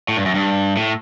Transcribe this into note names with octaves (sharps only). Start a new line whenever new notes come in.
A2
G2
F#2
G2
A2